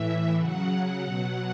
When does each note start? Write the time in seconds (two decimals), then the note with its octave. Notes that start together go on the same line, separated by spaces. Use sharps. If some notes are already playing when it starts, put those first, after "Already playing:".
Already playing: A2 E3 E5
0.39 C#3 F#3 F#5
1.05 B2 F#3